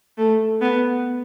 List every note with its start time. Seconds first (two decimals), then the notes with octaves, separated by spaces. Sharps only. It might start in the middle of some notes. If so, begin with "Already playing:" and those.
0.18 A3
0.62 B3